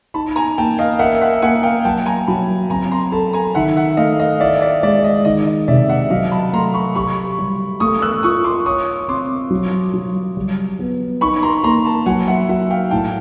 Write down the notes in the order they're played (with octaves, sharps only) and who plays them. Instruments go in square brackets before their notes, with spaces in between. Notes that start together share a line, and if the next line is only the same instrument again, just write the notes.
[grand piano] D#4 [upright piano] A5 B5
[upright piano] G#5 A#5
[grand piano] A#3 [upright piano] G5 A5
[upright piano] D#5 F5
[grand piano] A#4 [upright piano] E5 F#5
[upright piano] E5 F#5
[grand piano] A#3 [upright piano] F#5 G#5
[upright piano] F5 G5
[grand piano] F#3 [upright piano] G5 A5
[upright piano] G#5 A#5
[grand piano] F#3 [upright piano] A5 B5
[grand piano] C4 [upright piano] G#5 A#5
[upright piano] A#5 C6
[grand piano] A4 [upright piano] A5 B5
[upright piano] G#5 A#5
[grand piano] D#3 [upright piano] E5 F#5
[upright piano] E5 F#5
[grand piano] A3 [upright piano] D#5 F5
[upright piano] D#5 F5
[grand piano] E4 [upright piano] D5 E5
[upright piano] D5 E5
[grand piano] G#3 [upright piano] D5 E5
[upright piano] D#5
[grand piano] D#3 [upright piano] D#5
[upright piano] D#5
[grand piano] C3 [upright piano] D5 E5
[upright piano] E5 F#5
[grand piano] F#3 [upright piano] D#5 F5
[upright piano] A5 B5
[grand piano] A3 [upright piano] A#5 C6
[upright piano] B5 C#6
[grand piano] G4 [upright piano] B5 C#6
[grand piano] G3
[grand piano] A3 [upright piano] C#6 D#6
[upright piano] E6 F#6
[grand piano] F4 [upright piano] C#6 D#6
[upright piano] C6 D6
[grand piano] C#5 [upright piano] C#6 D#6
[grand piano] C4 [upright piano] C6 D6
[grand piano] F#3
F#3
G3
B3
[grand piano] D#4 [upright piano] B5 C#6
[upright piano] A#5 C6
[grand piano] A#3 [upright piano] A#5 C6
[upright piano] A5 B5
[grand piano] F#3 [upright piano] F#5 G#5
[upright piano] E5 F#5
[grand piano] F#4 [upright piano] E5 F#5
[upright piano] F5 G5
[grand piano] A2 [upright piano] G5 A5